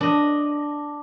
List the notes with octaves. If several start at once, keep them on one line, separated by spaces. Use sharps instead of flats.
D4 D#5